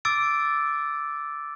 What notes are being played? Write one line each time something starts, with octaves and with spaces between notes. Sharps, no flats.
D6 E6 A6 D7